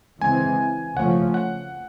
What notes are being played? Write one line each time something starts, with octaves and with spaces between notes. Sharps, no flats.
C#3 E3 G#3 C4 G#5
C#3 F3 A3 C#4 F#5
F#5